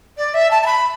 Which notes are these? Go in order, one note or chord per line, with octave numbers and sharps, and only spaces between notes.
D5
E5
A5
A5
B5